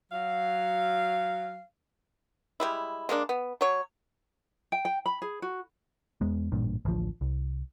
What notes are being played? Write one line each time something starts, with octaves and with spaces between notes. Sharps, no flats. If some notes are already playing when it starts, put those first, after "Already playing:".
F#3 F5
G3 G#3 E4
G#3 A#3 C#4 D4
B3
F#3 C#5
G5
G5
B5
G#4
F#4
E2 G#3 B3
A1 G2 A#2
A1 D2 F3
C2